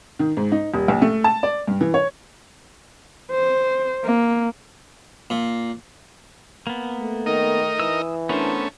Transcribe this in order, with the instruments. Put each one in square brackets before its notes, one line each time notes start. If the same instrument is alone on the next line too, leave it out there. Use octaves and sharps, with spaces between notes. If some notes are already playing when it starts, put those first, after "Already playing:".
[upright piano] D#3
G#2
D#4
D#1
A#1
A3
A5
D5
G2
E3
C#5
[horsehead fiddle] C5
A#3
[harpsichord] A#2
[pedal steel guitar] A#3 B3
[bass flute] A3
[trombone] D#3 [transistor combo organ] D#4 A#4 D#5
[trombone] E3 [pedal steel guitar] D#6 E6
[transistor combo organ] A3 C#4 [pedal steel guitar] B3 A#4 C5 [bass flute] D4